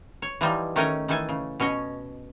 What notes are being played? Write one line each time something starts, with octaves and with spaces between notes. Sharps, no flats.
C#5
E3 F3 G3 D#4
D#3 A3 C#4 G5 G#5 A#5
D#3 E3 A3 A4 G#5
C#3
B2 C#4 C#5 D#5